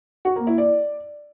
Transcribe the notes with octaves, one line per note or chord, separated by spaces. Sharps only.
F#4
A#3
E4
D5